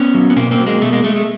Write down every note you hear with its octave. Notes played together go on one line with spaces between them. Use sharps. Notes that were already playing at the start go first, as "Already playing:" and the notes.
Already playing: B3 C#4
F#3
B3
B2 A#3 C4
A#3 C4
F#3
G#3 A#3
B2 A3
G#3 A#3
G#3 A3
A3